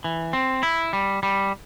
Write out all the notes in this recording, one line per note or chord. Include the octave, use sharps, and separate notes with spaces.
E3
C4
E4
G3
G3